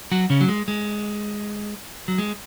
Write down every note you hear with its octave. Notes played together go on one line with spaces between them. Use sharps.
F#3 F#4
C#3 C#4
F#3
G#3
G#3
F#3
G#3